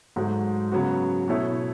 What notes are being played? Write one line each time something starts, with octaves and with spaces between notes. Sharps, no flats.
G#2 F#3 A3
C#3 F#3 B3 F#4
B2 A3 E4 A4 C#5